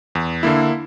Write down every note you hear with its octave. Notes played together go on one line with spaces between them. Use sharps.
E2
D3 A#3 E4